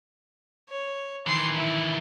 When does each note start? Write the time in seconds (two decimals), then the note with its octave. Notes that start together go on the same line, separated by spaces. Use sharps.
0.70 C#5
1.27 D#3 E3 C6
1.56 E4